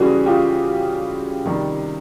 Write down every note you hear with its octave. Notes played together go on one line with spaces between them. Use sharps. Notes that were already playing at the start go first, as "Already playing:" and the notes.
Already playing: C#3 E3 G3 F#4 G#4
F4 G4
C3 D#3 G3